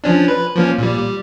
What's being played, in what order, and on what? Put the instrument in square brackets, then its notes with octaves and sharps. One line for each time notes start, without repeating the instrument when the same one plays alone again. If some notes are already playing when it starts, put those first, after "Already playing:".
[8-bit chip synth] F3 C#4 D4
B4
F3 A#3 C#4
A#2 G3
G3